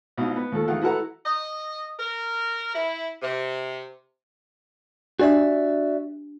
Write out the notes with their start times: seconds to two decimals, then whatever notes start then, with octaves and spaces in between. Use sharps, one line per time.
0.17 C2 B2 D#4 F4
0.36 B3
0.52 D#2 F3 A4
0.68 E2 D#3 F4 F#5
0.82 E4 F#4 A4 B4 F#5 A#5
1.26 D#5
2.00 A#4
2.75 E4
3.22 C3
5.20 D4 F#4 G4 D5 E5